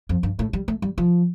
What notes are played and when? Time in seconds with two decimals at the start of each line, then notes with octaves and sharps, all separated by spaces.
0.09 F2
0.23 G2
0.39 A2
0.53 G3
0.68 A3
0.82 G3
0.98 F3